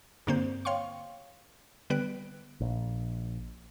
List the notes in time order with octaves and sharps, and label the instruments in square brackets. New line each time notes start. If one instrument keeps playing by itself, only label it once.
[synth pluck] G2 D3 A#3 C4 C5 G6
C#5 F5 G5 C6 C#6
D3 G3 B3 B4 F#6 D7
[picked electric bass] A#1